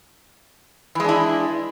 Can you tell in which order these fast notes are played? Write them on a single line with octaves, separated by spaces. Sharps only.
E3 G#3 D4 E4